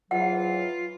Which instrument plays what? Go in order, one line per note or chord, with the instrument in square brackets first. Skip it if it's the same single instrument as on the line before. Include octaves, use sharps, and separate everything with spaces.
[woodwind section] G#2 E3 F#3 [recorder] F4 [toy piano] F#5